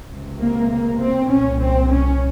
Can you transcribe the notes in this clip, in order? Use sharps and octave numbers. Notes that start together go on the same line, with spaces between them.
C#2 C3
A#3
A#3
C4
C2 A#2 C#4
C4
C#4